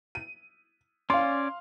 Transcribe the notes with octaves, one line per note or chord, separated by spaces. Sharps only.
D#7
C#4 D5 F5 C6